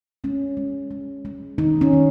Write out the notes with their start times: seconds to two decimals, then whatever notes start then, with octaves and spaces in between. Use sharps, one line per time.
0.24 G#3 C#4
0.57 G#3
0.91 G#3
1.25 G#3
1.58 D#3 D#4
1.81 C#4
1.93 D#3